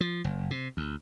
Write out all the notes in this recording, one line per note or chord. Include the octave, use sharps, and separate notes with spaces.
F3
F#1
C3
D2